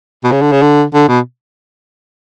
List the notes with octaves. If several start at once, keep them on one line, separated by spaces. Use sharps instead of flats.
B2
C#3
D3
C#3
D3
D3
B2